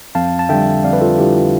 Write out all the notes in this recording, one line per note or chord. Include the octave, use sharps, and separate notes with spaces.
F2 F5 A5
A5
D3 G3 E5 G5
F2 D5 F5
B4
F4 A4
D3 G3 E4 G4
F4